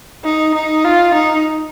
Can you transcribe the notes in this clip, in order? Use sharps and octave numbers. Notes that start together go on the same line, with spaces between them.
D#4
D#4
F4
D#4